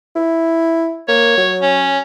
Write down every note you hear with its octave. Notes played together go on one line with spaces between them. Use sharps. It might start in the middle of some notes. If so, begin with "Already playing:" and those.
E4
A#3 C#5
F#3
C#4